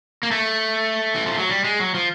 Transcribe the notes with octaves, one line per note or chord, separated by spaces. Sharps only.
A#3
A3
E3
F3
F#3
G3
G#3
F#3
F3